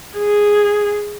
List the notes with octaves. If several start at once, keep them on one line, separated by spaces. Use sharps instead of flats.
G#4